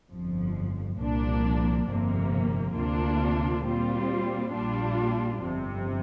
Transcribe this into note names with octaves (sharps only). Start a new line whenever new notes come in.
G1 F2 F3
C2 A#2 F3 A#3 D4
G1 F2 C3 A#3
D2 C3 A#3 D4 F4
A#2 G3 C4 F4
A#1 A#2 G3 D4 F4
G1 F2 C3